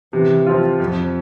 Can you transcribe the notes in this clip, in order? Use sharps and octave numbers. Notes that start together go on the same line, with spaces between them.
C3 E3
F3 C4 F4
F2 F3